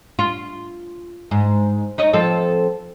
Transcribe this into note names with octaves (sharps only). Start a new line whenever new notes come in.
F4
G#2
D#4 C#5 D#5
F3 C4 A4